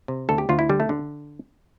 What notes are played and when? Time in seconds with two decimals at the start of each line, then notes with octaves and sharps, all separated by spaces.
0.08 C3
0.29 D2 A4
0.38 G4
0.49 D2 F4
0.59 E4
0.69 D3 G3
0.80 A3
0.89 D3